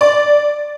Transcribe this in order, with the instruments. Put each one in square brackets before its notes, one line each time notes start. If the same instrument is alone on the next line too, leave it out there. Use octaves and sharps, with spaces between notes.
[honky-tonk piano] D5